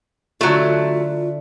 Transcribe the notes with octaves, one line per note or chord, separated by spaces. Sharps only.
D3 F#3 A3 E4 F4